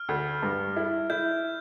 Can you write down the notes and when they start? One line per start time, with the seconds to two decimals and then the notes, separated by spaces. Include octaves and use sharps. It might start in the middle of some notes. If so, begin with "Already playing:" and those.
Already playing: F6
0.09 D2
0.43 G2
0.76 E4
1.10 E4 G6